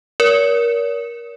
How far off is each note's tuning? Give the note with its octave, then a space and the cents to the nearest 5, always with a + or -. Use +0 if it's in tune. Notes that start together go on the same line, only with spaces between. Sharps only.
A#4 +20 C#5 +45